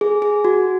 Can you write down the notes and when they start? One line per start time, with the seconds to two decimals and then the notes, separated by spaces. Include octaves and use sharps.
0.01 G#4
0.22 G#4
0.45 F#4